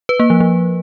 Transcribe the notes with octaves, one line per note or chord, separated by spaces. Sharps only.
B4
A#3
F3
F3